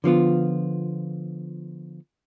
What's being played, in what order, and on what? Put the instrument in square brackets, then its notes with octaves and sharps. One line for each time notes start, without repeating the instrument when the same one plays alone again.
[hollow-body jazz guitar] D3 F3 B3 F4